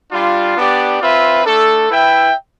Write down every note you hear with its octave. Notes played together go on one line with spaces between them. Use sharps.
G3 D4 F4
B3 D4 G4 D5
C4 F4 B4 E5
A3 D4 A4
E4 B4 E5 G5